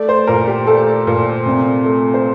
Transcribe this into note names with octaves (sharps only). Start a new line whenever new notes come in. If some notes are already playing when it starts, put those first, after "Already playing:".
Already playing: A3 D5
C5
A#2 A#4
G4
A3 A4
A#2
C3
A3
C5